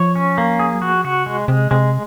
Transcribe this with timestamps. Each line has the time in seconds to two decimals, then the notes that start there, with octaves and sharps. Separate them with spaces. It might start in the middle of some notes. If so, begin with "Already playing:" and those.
Already playing: F3 C#5
0.15 C#4
0.38 A#3
0.59 G#4
0.75 F#3
0.82 F3 F#4
1.05 C#3 F#4
1.26 C3 G#3
1.48 C3 G#3
1.71 C3 G#3